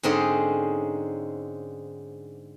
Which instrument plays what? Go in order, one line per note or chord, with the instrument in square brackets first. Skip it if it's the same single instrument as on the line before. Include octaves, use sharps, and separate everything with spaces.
[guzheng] G#2 D3 C4 C#4 D#4 G#4